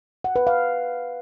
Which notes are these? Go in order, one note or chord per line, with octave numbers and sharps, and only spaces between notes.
F#5
B4
F5